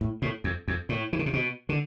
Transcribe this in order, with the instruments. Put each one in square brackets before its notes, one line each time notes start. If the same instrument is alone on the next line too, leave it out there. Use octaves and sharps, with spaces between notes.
[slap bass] A2
A2
F2
F2
A2
E3
D3
C3
B2
D3